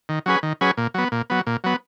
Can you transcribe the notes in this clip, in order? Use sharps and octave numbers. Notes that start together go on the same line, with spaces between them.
D#3
F#3 C#4 G#4 B4
D#3
F#3 C#4 G#4 B4
A#2
F#3 B3
A#2
F#3 B3
A#2
F#3 B3